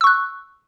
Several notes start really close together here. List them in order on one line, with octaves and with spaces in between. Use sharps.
E6 C#6 F#6